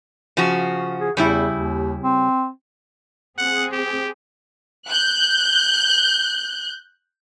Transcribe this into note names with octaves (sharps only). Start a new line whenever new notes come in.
C#3 F3 F#4
G#4
E2 C#3 G3 E4
D#2
C4
C4 G#4 F#5
G4
F#6 G6